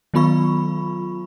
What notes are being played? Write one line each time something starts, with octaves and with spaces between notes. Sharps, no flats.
D#3 F#3 B3 F4 B5 C#6